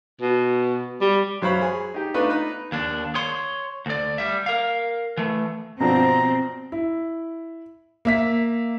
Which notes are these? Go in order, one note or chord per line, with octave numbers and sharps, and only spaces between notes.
B2
G3
F#2 F#3 C5 C#5 F5 B5
G#4
D#4 G4
A3 B3 D4 D#4 F4 B4
D#4 B4
D#2 D4
C#5 C6
D2 D5
G3 E5
A#4 F5
E3 A3
G2 B2 F3 C4 D4 A#5
E4
A#3 E5 B6